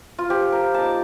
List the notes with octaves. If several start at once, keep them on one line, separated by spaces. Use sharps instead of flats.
F4
F3 G4
A#4
A#3 D#4 A5